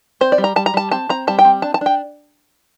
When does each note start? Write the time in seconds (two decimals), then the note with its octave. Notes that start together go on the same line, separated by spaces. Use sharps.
0.21 C4 C5
0.32 D5
0.38 G3
0.44 A#5
0.56 G3 A5
0.66 A#5
0.74 G3 A5
0.91 C4 A5
1.09 C4 A#5
1.27 G3 A5
1.39 G5
1.45 C4
1.62 D4 A5
1.74 A5
1.81 D4 G5